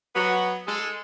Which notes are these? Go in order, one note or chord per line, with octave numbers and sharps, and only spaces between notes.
F#3 B3 F#4
G#3 G#4 A4